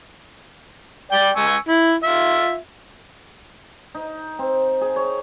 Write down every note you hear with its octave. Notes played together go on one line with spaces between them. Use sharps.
D5 G5
G#5 C#6 E6
E4
F4 E5
D#4
C4
G#4
C#5